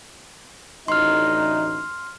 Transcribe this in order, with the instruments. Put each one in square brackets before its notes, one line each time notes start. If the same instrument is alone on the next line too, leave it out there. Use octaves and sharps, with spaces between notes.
[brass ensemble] A1 D2 D#4 [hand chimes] C6 F6